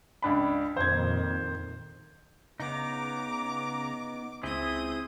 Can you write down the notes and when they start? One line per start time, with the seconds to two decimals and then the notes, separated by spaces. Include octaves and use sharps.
0.22 C#2 D4 B5
0.77 F2 A#2 D#3 C5 G#6
2.60 C#3 B3 D#4 A#5 D6
4.43 C#2 C4 E4 G#4 D#6 G6